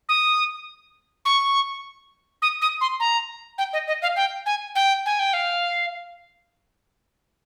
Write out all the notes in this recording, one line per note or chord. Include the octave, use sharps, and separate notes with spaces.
D#6
C#6
D#6
D#6
C6
A#5
G5
D#5
D#5
F5
G5
G#5
G5
G#5
G5
F5